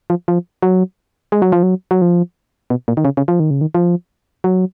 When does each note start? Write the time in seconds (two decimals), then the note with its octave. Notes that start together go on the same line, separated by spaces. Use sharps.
0.10 F3
0.28 F3
0.62 F#3
1.32 G#3
1.42 F#3
1.52 F3
1.63 F#3
1.91 F#3
2.02 F3
2.70 B2
2.88 A#2
2.97 D#3
3.05 C#3
3.17 C#3
3.28 F3
3.40 D#3
3.50 C#3
3.61 D#3
3.75 F3
4.44 F#3